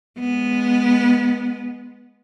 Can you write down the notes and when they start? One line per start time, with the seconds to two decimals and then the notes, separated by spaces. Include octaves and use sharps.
0.19 G#3 B3